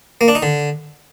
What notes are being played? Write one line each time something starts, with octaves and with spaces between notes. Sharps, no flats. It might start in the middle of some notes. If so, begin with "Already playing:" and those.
A#3
D4
D#4
D3